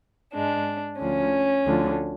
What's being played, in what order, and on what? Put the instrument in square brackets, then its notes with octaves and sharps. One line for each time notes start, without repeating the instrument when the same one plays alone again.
[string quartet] G#2 G#3 D4
D2 D3 F3 C#4
D2 D3 F3